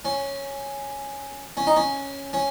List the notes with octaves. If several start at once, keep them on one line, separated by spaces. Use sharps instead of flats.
C#4
C#4
D#4
C#4
C#4